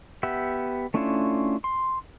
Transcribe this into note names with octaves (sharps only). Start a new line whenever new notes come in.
B3 G4 E5 F#5
A3 C#4 D4 E4 F4
C6